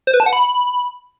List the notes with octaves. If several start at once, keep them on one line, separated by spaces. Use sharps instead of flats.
C5
B4
A5
F#5
B5